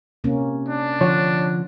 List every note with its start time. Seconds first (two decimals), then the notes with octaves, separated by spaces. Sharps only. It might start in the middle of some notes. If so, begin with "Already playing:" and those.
0.24 C3 A#3 C#4
0.69 D4
1.01 D3 F3 C#5